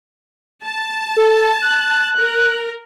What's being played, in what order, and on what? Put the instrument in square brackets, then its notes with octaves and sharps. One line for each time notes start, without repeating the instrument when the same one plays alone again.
[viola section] A5
[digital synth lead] A4
F#6
[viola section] A#4